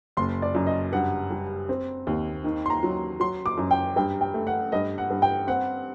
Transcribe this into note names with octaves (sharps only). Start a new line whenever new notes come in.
F#1 C6
D5
F#2
D#5
G2 F#5
G3
C4
D#2
D#3
C6
A#5
F#3
F#3 C6
D6
F#2
G5
G2 G5
G5
A3
F#5
G2 D#5
F#5
G2
G5
C4 F#5